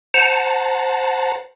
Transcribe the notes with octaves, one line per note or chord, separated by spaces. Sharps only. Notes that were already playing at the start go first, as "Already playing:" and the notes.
C5 F#5 A5 A#5